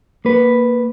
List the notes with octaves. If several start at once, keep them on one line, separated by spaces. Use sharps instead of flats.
A#3 B4